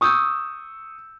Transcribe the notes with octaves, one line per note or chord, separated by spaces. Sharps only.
C#6 D#6 E6 G6